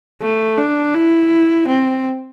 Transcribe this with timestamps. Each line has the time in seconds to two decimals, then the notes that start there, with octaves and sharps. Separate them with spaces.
0.21 A3
0.57 D4
0.95 E4
1.68 C4